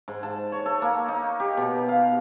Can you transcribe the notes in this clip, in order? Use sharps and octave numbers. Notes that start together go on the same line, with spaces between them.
G#2
A5
C#5
A4
A#3
D#4
G4
B2
F5